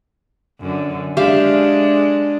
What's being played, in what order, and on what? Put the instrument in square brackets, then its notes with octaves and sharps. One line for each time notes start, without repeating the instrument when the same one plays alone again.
[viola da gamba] F#2 D3
[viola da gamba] G#3 D4 [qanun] G4 E5 F5